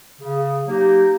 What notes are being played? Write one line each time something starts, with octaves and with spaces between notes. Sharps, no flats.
C#3
F#3 A#3 D#4 G4